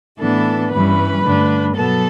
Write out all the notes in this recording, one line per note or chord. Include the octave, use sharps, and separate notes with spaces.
A2 E3 B3 D4 A4 A5
G2 E3 G3 C#4 B4 B5
G2 D3 A3 D4
B2 F#3 B3 A4 A5